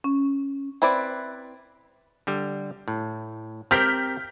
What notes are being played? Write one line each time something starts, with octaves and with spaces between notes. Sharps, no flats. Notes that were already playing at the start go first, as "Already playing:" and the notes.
C#4
C4 E4 B4 D5
D3 G3
A2
C4 G4 A#4 F6 G6 B6